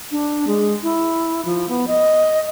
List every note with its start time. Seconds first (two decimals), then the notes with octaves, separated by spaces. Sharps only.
0.12 D4
0.47 G#3
0.83 E4
1.45 F3
1.69 B3
1.88 D#5